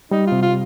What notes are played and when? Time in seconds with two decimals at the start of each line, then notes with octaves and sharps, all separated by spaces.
0.11 G3 D#4
0.27 F4
0.32 C3
0.42 F4